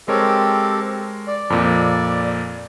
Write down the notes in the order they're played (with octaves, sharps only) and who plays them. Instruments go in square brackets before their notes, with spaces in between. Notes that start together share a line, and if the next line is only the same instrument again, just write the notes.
[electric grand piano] G#3 A#4 C#5 [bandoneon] C4 G4 A4
[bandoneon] D5
[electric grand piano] F2 A#2